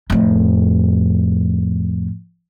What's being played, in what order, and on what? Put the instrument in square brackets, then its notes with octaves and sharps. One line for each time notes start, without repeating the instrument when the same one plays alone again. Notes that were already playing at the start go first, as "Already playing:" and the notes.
[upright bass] F2 A2